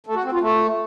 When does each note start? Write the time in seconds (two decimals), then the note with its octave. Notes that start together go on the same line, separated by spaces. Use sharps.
0.07 A3
0.15 F#4
0.24 C4
0.32 F4
0.41 A3